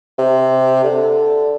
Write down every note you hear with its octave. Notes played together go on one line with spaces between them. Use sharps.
C3
D3